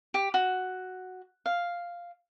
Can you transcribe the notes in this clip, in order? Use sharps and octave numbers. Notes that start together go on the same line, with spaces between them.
G4
F#4
F5